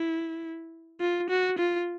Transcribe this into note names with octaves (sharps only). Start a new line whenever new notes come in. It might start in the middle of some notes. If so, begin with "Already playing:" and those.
Already playing: E4
F4
F#4
F4